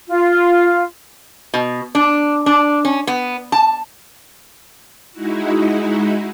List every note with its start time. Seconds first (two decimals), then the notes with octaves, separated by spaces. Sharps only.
0.08 F4
1.54 B2
1.95 D4
2.46 D4
2.85 C#4
3.07 B3
3.52 A5
5.13 G#3 D#4 E4 F#4